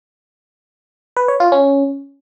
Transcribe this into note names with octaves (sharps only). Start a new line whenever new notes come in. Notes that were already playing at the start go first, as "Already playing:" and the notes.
B4
C#5
F4
C#4